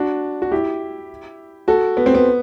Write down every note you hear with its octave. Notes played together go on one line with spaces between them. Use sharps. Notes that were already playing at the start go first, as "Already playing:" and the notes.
Already playing: D4 F#4
F#4
E4 G4
F#4 A4
B3
C4
B3